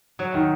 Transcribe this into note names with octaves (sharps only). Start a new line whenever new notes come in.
F#3
D#3 D#4